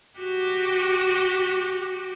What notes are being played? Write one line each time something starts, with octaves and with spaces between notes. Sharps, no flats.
F#4 G4